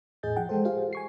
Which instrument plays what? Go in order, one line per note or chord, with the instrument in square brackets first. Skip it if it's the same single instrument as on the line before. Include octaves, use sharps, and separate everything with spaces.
[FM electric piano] E2 A2 G#4 D#5 G6 A6
E3 F3 F#5 G5
G#3 A4 C5
F4 G4 G#4 C5 F5
G#5 C#6 C7